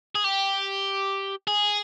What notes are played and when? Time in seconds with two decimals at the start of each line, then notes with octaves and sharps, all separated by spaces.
0.15 G#4
0.24 G4
1.48 G#4